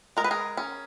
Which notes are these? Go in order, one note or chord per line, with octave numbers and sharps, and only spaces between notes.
G#3 A#4
B4
G#4 A#4
C#4